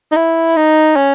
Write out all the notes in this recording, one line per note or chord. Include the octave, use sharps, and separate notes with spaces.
D#4
E4
D#4
C#4